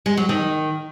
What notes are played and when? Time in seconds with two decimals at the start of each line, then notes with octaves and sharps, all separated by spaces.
0.06 G#3
0.17 F#3
0.29 D#3